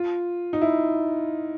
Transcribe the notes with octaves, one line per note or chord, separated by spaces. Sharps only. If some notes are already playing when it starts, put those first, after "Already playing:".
Already playing: F4
D#4
E4